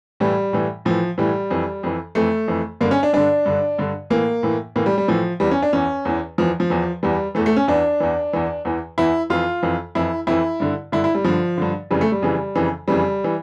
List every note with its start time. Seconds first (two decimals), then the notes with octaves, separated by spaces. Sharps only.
0.20 A2 E3 G3
0.53 A2 E3
0.85 A2 E3 F3
1.18 A2 E3 G3
1.51 F2 E3
1.83 F2 E3
2.15 F2 E3 A3
2.48 F2 E3
2.81 G2 D3 A#3
2.91 C#4
3.03 D4
3.13 G2 D3 D4
3.46 G2 D3
3.78 G2 D3
4.10 A2 E3 A#3
4.43 A2 E3
4.76 A2 E3 A#3
4.86 G3
4.98 G3
5.08 A2 E3 F3
5.40 E2 E3 G3
5.51 C#4
5.62 D4
5.73 E2 E3 C#4
6.05 E2 E3
6.38 E2 E3 F3
6.60 F3
6.70 E2 E3
7.03 E2 E3 G3
7.35 E3 A3
7.38 E2
7.46 A3
7.56 C#4
7.68 E2 E3 D4
8.00 E2 E3
8.33 E2 E3
8.65 E2 E3
8.98 E2 E3 E4
9.30 F2 E3 F4
9.63 F2 E3
9.95 F2 E3 E4
10.27 F2 E3 E4
10.60 G2 D3
10.92 G2 D3 E4
11.04 E4
11.15 G3
11.24 G2 D3 F3
11.58 G2 D3
11.91 F2 C#3 E3 G3
12.01 A3
12.12 G3
12.22 F2 C#3 E3
12.56 F2 C#3 E3
12.88 F2 C#3 E3 G3
13.24 E3